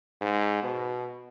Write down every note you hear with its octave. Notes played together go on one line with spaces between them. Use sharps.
G#2
B2